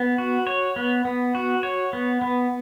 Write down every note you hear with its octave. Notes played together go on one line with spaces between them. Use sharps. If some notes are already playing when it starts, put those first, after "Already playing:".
Already playing: B3
F#4
C#5
B3
B3
F#4
C#5
B3
B3